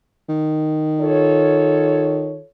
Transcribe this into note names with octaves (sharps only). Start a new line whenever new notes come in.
D#3
F4 A4 C#5